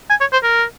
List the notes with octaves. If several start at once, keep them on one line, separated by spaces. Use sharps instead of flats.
G#5
C#5
C5
A#4